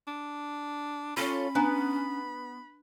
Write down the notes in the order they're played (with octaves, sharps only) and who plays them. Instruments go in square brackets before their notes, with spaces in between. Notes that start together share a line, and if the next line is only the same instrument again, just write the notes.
[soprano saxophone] D4
[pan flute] C#4 [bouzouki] F4 A4 C#5 [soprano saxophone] B5
[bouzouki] B3 [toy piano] D4 G#5 A#5